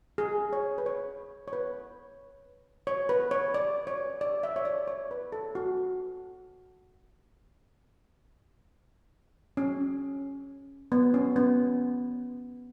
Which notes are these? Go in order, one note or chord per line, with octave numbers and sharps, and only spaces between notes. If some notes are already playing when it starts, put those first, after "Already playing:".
G#4
C#5
B4
C#5
C#5
B4
C#5
B4
C#5
D5
C#5
D5
E5
C#5
D5
C#5
B4
A4
F#4
C#4
B3
C#4
B3